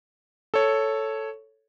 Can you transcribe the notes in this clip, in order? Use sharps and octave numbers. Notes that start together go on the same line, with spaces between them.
A4 C#5